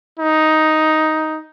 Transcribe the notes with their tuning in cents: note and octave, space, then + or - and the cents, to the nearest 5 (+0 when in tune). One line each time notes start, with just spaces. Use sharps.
D#4 +5